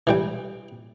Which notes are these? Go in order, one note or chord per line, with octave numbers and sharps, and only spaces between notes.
E3 G3 G5